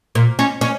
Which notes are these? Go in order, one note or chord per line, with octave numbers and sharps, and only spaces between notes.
A#2
C#4
C#4